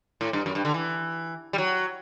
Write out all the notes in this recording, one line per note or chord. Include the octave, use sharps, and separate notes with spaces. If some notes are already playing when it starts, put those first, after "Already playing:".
A2
G2
F#2
G2
D3
E3
G3
F#3